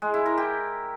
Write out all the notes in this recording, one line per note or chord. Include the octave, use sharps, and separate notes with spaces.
G#3
E4
A#4
G4